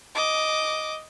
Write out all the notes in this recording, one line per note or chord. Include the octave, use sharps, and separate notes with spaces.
D#5 D6